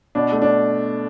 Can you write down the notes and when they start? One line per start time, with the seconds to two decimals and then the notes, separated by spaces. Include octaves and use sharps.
0.15 B2 D4
0.32 A3
0.42 D4